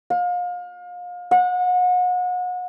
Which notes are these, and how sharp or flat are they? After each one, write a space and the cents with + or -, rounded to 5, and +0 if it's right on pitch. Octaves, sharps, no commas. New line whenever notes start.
F5 +35
F#5 -35